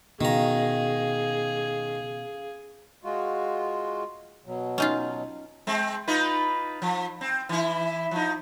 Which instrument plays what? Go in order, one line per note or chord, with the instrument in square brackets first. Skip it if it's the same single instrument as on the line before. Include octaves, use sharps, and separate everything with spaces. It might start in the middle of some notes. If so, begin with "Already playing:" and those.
[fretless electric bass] B2 [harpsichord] D#3 A#5 [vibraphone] C#4 F5 [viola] G#4
[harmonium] G#3 F4 F#4
B2 F#3
[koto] C#4 D#4 F4
[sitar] G#3 C4
D#4 F4 B4
F3
C4
E3 E4
F3 D#4